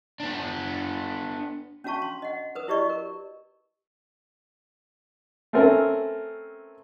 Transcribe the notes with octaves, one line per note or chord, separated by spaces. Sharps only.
B3 D4
C#4 D4 F#4 F5 A5 C#6
C6
D#5 F#5
A#4 B4 D#6
E4 F#4 G4 D5 D#5 C#6
A#4
A3 C4 C#4 A#4